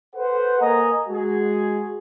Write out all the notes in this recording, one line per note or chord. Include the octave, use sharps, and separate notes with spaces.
A4 B4 C5 F#5
A#3 D#5 G#5 A#5
G#3 F#4 G#4